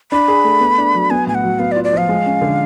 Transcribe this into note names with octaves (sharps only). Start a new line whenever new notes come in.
D4 B5
G#4
A3
B3
D4
F#3
B3 G#5
A2 G#5
F#5
F#3
B3 F5
D5
F4
D5
F3 F5
G#3
C#4
D3